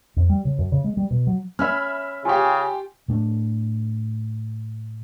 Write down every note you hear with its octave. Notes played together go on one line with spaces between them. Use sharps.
F2
G3
C#3
F#2
C#3
G#3
G3
B2
F#3
C#4 E5 B5 F6
C#3 F4 G4 G#5
A2 A3 D4